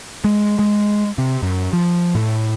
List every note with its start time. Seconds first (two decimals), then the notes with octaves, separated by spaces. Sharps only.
0.24 G#3
0.59 G#3
1.18 C3
1.42 F#2
1.73 F3
2.15 A2